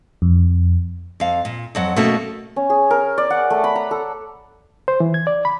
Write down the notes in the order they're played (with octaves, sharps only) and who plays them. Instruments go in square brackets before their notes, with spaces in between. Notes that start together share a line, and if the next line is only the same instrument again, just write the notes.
[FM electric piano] F2
[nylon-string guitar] F2 F5
A#2
F2 F#3 F#5
B2 A3 A#3 C#4 F#4 A4
[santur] C#4
G#4
A#4
D5
F#5
A3
B5
A#5
A4
[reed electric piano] C5
E3
G#6
D5
B5